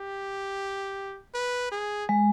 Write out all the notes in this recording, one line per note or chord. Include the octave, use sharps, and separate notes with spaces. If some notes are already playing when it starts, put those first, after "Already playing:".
Already playing: G4
B4
G#4
G#3